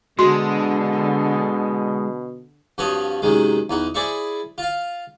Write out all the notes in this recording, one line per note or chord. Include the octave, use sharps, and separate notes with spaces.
B2 D3 G#3 F#4 C6
G2 F3 C4 F#4 C#5 D#5
F#2 C3 D#3 G#3
E2 D#4 F#4
E4 G#4 C5 D5 E5 C#6
F4 F5